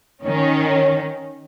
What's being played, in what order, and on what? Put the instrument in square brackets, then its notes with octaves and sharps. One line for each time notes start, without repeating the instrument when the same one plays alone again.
[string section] D#3 C#4